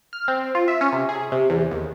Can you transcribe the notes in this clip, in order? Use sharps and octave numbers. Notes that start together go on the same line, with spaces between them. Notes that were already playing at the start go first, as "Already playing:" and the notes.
F6
C4
F4
E5
C#4
C3
G#4
C3
E2
D#2